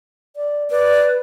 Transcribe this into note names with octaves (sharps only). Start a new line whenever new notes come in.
D5
B4 D5